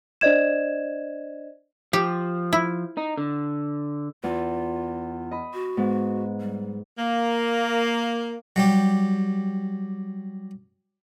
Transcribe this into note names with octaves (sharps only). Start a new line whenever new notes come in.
D4 C5 D5 D#5 G#6 E7
F3 G4
E4
D#4
D3
E2 F4
D#5 B5
F#4
G#2 B3
G3
A#3
F#3 G3 G4